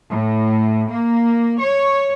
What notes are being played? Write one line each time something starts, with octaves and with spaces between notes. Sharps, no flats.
A2
A#3
C#5